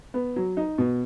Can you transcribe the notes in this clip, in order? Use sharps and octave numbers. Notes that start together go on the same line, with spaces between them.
B3
F#3
D#4
B2